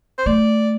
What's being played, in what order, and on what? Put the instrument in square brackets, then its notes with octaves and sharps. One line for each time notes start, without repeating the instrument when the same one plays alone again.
[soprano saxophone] C5
[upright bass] A3 [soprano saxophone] D5